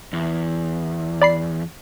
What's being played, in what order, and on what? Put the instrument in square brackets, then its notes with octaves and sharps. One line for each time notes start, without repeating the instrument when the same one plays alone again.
[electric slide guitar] E2
[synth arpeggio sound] D5 B5 C7